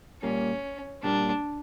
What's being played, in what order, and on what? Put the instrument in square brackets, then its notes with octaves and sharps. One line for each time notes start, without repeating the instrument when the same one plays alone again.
[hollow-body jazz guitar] A#2 G3 A#3 [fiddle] C#4
[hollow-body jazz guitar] A#2 G3 A#3 [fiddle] D4